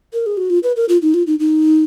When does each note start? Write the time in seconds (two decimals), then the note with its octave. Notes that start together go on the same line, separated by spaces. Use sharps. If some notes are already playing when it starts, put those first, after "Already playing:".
0.13 A#4
0.26 G#4
0.37 F#4
0.50 F4
0.63 B4
0.76 A#4
0.89 F4
1.02 D#4
1.14 F4
1.27 D#4
1.39 D#4